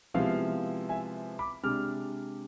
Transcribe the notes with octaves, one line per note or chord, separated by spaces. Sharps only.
C3 F3 G#3 B3 E4 F5
E5 G#5
B5 D6
C3 G#3 D4 D6 F6